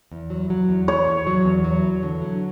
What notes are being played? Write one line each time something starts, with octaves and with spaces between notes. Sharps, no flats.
E2
F#3
F#3
E2
E2 C#5
E2
F#3
E2
F#3
E2
D3
F#3